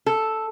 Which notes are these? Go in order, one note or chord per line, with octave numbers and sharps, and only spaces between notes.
A4